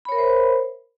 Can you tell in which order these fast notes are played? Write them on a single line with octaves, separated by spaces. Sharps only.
B5 C#5 A#4 E5 C5